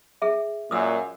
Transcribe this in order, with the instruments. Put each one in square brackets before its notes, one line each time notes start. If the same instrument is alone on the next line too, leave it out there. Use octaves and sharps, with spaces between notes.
[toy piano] G#4 E5
[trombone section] F#2 A#2 [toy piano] D#6 E6